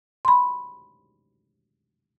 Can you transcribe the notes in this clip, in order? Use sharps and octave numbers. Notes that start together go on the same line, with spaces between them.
B5 C6